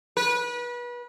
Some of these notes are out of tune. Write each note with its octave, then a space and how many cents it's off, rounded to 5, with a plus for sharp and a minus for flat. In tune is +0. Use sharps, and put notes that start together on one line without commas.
B4 -30